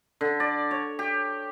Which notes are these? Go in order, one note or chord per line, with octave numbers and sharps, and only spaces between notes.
D3
D5
C#5
G4